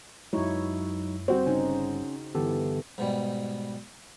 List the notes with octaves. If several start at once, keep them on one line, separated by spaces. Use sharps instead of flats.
F#2 F#3 G#3 D#4 E4 C#5
G1 G3 C4 F#4 C5
C#3 C#4 D#4
G2 D3 E3 B3 G4 A4
G#2 B2 G3